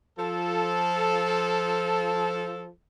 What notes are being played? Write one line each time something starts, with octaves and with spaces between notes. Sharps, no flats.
F3 A4